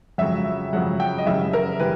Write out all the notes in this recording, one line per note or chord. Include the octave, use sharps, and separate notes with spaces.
F2 C#3 F#3 E5
F2 C#3 F#3 F#5
G5
D#5
F#2 C#3 E3 G3 E5
A#4
E3 G3 B4